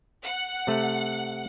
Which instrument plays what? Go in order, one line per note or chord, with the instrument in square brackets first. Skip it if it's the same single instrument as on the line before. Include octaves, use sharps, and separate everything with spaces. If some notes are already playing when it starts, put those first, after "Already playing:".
[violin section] F#5
[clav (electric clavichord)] C3 A3